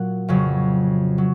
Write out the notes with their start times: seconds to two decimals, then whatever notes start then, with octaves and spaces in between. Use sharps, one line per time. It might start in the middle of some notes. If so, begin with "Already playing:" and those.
Already playing: A#2 F#3 F#5
0.28 F2 C#3 F#3
1.18 F#3